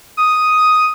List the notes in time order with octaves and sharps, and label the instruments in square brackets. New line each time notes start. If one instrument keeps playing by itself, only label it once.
[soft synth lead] D#6